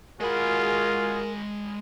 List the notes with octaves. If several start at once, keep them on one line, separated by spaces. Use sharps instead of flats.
G#3 F4 F#4 G#4 A#4 B5